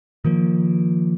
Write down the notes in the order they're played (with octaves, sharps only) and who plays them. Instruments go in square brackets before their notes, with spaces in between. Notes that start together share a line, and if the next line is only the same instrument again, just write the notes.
[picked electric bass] D#3 F3 A#3